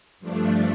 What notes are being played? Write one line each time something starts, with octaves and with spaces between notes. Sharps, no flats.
G2 F3 A3 D4